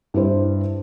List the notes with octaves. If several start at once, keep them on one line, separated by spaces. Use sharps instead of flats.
G2 E4 C5